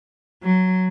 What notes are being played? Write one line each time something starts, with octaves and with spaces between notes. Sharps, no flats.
F#3